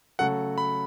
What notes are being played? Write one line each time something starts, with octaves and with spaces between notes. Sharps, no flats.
C#3 F#3 A3 F#4 A4 F#5
B5